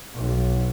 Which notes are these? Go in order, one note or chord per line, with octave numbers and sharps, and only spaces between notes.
B1